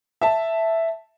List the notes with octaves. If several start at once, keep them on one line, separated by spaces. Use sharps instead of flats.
E5 A5